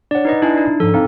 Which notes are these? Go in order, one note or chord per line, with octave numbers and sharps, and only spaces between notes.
D4 C#5 D5 F#5
D#4 B4 D#5
D4 E4 D5 G#5
D4 D#4
G#2 F3 A4
C4 D#4 F5 A#5